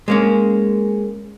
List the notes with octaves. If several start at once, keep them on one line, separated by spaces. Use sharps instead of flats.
G#3 A#3 C#4